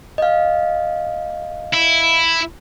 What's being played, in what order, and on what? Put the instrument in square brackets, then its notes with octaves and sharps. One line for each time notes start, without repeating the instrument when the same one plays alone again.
[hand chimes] D#5 F5
[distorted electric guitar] E4